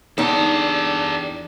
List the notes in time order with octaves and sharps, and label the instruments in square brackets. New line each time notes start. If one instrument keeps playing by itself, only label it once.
[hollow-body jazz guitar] E2 D#4 [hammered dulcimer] D4 [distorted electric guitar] G4 A4